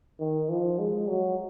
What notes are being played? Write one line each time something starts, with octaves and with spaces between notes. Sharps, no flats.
D#3
F3
G#3
F#3